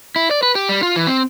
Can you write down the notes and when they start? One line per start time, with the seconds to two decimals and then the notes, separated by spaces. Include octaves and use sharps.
0.16 E4
0.31 D5
0.43 B4
0.55 G4
0.69 G3
0.83 F4
0.96 E3
1.07 C4